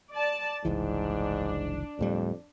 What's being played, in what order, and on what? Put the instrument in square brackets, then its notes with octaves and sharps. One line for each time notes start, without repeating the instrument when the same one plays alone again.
[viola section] D5 A5
[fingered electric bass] F#1 C2 E3 [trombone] G#2 [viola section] D4
[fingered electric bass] D1 A2 G3 [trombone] F2